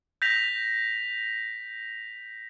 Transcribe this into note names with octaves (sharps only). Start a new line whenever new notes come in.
G6 A#6 B6 F7